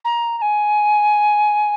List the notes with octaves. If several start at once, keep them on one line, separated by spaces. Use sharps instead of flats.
A#5
A#5
G#5